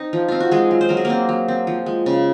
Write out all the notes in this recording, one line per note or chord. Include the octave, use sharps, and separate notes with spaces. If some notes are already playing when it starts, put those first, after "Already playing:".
Already playing: C4 D#4
F3
C4 F4
F#4
G#3 F4 G#4
F#3
C5
F#3 A#4
G#4
A#3 A#4
C4
F#3
C4
F3
G#3
C#3